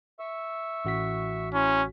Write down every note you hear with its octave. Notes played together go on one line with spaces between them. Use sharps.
E5 C#6 E6
A1 F#4 B6
C#4 E4 A#5 C6